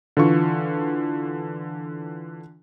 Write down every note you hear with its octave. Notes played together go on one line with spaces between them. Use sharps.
D3 E3 F4 C#6